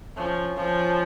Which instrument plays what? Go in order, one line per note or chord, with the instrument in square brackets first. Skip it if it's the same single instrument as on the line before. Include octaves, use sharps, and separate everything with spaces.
[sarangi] F3 [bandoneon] C#4
[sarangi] F3